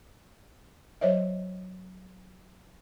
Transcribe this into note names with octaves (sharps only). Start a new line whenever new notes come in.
F#3 C5 C#5 D#5 E5